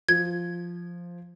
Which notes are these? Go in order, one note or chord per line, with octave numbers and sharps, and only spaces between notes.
F3 G#6